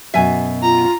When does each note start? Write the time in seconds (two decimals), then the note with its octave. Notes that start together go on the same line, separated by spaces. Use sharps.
0.14 F#2 B2 E5 G#5
0.62 F4 A#5